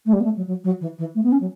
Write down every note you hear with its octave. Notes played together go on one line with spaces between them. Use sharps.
A3
G3
B3
A3
F#3
F#3
F#3
E3
E3
A3
B3
C#4
F#3